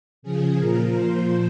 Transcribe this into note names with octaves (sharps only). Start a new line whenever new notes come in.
C#3 F3 G#4
A#2 F3 A#4
A#2 F3 C5